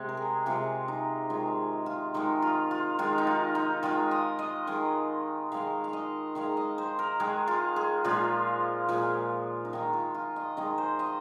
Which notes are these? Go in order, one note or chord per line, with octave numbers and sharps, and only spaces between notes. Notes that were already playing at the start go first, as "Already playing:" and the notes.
Already playing: C3 G#3
A#4
G#4
C3 G#3 F4
D#4
D#3 G#3 F4
F4
D#3 G#3 D#4
F4
F4
D#3 G#3 F4
D#4
F4
D#4
D#3 G#3 F4
D#5
D#5
D#3 G#3
D#3 G#3 F5
F5
D#5
D#3 G#3 F5
D#5
C5
A#4
D#3 G#3 G#4
F4
G#4
A#2 F3 G#3 F4
A#2 F3 G#3
D#4
D#3 G#3 F4
F4
F4
D#5
D#3 G#3 D#5
C5
D#5